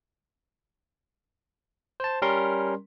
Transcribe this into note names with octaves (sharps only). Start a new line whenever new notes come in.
C5 A5
G3 C#4 A#4 C6